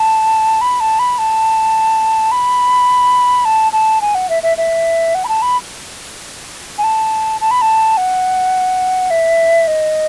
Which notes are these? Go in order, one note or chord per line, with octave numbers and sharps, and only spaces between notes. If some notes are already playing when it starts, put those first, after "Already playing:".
Already playing: A5
B5
A5
B5
A5
B5
A5
A5
G#5
F#5
E5
E5
E5
F#5
B5
A5
B5
G#5
A5
A5
B5
A5
F#5
E5
D#5